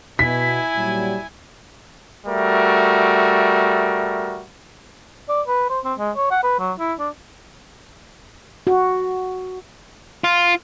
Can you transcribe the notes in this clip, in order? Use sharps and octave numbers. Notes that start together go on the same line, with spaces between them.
B2 E4 G#5 B6
A#2 F#3 G3
G3 A3 F#4 A#4 E5
D5
B4
C5
C4
G#3
C#5
F#5
B4
F#3
E4
D4
F#4
F4